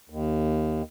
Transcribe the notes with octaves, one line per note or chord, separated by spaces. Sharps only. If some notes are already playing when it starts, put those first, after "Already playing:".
D#2